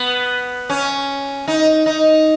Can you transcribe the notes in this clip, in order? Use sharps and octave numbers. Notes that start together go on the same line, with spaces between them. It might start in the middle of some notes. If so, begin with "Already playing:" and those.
Already playing: B3
C#4
D#4
D#4